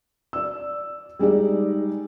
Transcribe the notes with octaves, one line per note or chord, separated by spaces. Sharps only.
D5 E6
G3 G#3 D#4 D5